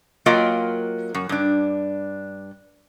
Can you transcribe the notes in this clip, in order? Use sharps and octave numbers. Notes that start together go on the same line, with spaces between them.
F#3 A#3 F4 A#4 D#5 G5
F#2
G2 D4